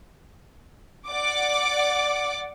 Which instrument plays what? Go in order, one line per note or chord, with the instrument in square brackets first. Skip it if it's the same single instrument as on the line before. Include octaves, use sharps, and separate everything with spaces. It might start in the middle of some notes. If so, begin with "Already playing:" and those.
[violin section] D5 F#5 D6